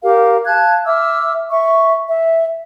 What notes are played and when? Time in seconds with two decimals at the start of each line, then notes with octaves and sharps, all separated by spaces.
0.03 G4 A#4 F5
0.45 F5 A5 F#6 G#6
0.85 E5 D6 E6 F6
1.49 E5 C#6
2.06 E5